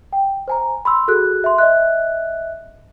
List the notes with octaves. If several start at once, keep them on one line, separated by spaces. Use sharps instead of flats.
G5
C5 G#5 A#5
B5 C6 E6
F#4 G#4 A4 F#6
E5 C6
D#5 E5 F#6